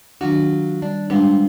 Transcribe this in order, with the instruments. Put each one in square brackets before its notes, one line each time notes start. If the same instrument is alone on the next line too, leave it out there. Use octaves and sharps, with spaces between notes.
[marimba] D#3 D4 [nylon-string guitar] F#3 F4 F#4
[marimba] G3 [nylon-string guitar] D4
[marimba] G3 G#3 D4 [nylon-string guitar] B3 C4 F4